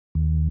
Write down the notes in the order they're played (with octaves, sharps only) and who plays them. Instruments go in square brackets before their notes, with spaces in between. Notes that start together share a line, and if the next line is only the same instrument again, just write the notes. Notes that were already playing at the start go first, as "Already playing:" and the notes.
[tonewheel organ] D#2